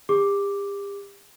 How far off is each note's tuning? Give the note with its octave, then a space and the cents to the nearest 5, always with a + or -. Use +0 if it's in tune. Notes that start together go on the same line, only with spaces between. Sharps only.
G4 +40 D6 +0